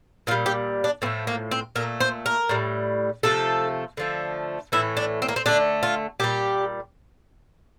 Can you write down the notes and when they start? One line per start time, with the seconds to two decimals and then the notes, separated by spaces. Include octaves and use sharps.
0.27 A#2 F4
0.31 G3
0.46 G4
0.84 D4
1.02 A2 F3 A3 C4
1.27 A#3
1.51 C4
1.76 A#2 A3 A#4
2.00 C5
2.26 A#4
2.49 A2 G3
3.23 C3 F3 A3 A4
3.97 D3 F3 A3
4.72 A2 E3 A3 E4
4.97 D4
5.22 C4
5.29 A#3
5.36 C4
5.46 D3 A3 D4
5.83 F4
6.20 A#2 G3 G4